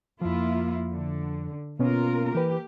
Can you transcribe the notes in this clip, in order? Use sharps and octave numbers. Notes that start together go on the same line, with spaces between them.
F2 F3 A#3 E4 F4
D3
B2 A#3 B3 C#4 F4 A#4
E3 G4 B4